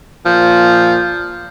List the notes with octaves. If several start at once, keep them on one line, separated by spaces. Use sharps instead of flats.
A#2 F3